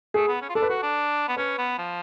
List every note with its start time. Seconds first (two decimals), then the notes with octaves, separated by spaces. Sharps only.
0.14 A3 G#4
0.28 B3
0.42 C#4
0.49 F4
0.55 D4 A4
0.62 B4
0.69 F#4 A4
0.82 D4
1.28 B3
1.36 C#4 B4
1.58 B3
1.78 F3